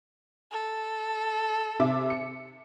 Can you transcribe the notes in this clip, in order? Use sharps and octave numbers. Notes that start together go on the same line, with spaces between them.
A4
C3 E5 D6
C#7